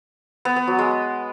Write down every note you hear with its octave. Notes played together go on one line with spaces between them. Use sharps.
B3
B3
F#3
G#3